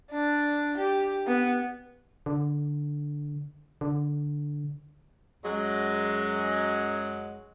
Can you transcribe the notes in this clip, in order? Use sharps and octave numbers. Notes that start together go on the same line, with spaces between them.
D4
G4
B3
D3
D3
F#2 F#3 G#3